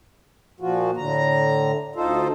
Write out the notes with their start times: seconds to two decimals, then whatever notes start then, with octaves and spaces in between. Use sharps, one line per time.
0.60 A#2 F3 F4 F#4
0.97 A2 D3 A#5
1.95 D2 D#4 F4 A4 C5